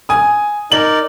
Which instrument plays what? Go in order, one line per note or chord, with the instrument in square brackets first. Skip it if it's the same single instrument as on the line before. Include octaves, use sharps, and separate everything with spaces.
[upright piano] G#5 D#6
[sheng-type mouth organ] D#4 A#4 D5 [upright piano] F#7